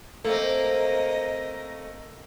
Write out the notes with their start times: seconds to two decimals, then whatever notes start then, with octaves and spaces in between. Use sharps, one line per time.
0.24 A3 A#3 C4 A#4 D#5